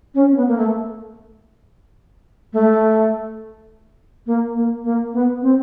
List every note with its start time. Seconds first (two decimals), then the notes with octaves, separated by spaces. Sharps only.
0.15 C#4
0.31 C4
0.36 B3
0.48 A#3
0.58 A3
2.53 A3
4.26 A#3
4.55 A#3
4.84 A#3
5.13 B3
5.42 C4